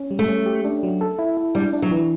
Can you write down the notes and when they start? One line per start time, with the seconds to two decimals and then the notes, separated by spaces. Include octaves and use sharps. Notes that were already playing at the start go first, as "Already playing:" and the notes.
Already playing: C#4
0.11 G3
0.19 A3
0.28 C#4
0.46 G4
0.64 D4
0.83 F#3
1.01 A4
1.19 E4
1.37 E4
1.55 G3 D4
1.73 D4
1.82 F#3
1.91 E3